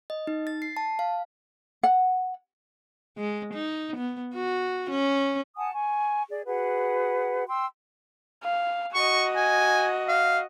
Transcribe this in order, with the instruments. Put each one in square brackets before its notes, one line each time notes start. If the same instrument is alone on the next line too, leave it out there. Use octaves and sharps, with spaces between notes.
[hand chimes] D#5
D#4
A6
C7
A5
F5
[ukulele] F#5
[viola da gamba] G#3
D#4
B3
F#4
C#4
[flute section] F#5 G#5 A5 D#6
G#5 C#6
G#4 D5
F#4 G#4 B4 F#5
G5 C6 E6
[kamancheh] F5
[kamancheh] F#4 D#5 [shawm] C#6
[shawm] G#5
F5